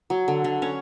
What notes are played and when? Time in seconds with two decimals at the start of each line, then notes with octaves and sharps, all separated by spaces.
0.10 F#3
0.28 D3
0.44 D3
0.62 C#4